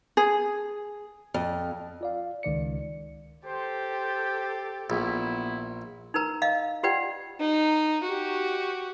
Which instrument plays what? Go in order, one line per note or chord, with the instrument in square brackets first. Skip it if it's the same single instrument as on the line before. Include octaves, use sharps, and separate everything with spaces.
[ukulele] G#4
[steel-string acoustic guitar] F2
[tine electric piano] F4 D5 F5
C#2 D#3 D5 C#7
[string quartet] G4 A4 [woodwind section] C5
[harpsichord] A#1 [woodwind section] B3 E4
[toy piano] D#4 A#4 B4 A#5
D#5 F5
F4 G4 B4 D5 F#5 G5
[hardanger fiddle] D#4
F#4 G4